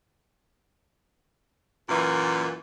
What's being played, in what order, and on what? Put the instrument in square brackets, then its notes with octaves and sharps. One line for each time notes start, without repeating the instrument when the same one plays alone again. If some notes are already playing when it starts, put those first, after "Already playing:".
[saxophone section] F#2 A#2 E3